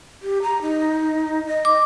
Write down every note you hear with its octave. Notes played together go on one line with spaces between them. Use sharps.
G4
A#5
D#4
D#5
D6